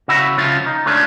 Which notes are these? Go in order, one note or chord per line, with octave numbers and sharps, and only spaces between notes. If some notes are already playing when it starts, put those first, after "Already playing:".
C#3 F#4 E5 B5
C#3 F3 F4
D#4
A3 C#4 D4 F4